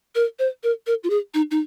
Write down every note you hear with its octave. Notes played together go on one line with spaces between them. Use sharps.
A#4
C5
A#4
A#4
F4
G#4
D#4
D#4